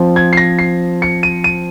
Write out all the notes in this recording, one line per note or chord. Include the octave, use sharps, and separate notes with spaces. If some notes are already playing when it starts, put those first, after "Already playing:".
Already playing: F3 C4
G#6
C7
A#6
C7
C#7
D#7
D#7